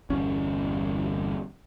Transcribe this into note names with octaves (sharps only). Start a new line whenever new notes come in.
G1 E2 C#4